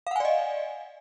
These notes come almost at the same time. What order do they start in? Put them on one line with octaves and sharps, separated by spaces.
F5 F#5 G#5 D5 D#5